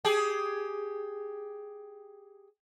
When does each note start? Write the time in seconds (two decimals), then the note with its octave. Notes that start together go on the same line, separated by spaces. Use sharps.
0.05 G4 G#4